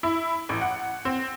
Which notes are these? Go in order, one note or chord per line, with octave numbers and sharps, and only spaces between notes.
E4
A1
F#5
C4